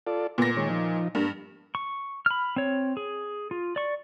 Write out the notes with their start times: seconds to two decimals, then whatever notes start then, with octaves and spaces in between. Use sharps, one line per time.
0.07 F4 A4 D5
0.38 A#2 B3 A#6
0.57 D#3 G#3 C#5
0.69 F3 D#4
1.15 G2 A#3
1.75 C#6
2.26 B5 F6
2.56 C4 C#5
2.97 G#4
3.51 F4
3.76 D5 C#6